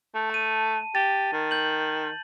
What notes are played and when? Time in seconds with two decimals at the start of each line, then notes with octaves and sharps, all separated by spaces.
0.14 A3
0.30 A5 D#7
0.95 G4 A6
1.33 D#3
1.51 G6 F#7